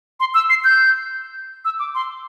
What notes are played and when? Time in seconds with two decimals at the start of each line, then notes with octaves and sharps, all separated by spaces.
0.20 C6
0.34 E6
0.50 C7
0.64 G6
1.65 E6
1.79 D6
1.95 C6